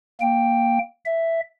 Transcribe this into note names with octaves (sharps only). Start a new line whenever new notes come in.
A#3 G5
E5